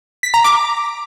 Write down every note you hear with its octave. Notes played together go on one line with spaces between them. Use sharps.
B6
A#5
D6